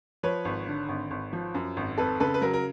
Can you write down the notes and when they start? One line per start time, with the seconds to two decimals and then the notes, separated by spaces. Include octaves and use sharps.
0.23 F3 B4 C#5
0.45 G#1
0.67 D3
0.89 G#1
1.11 G#1
1.33 F3
1.54 F#2
1.77 G#1
1.98 F2 A4 B4
2.20 C#3 A4 B4
2.34 B4
2.41 F#3 A#4
2.53 A#4